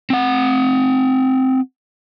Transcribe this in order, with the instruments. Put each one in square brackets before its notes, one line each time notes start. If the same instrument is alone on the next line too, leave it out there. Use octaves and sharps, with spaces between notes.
[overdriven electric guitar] C4 F#5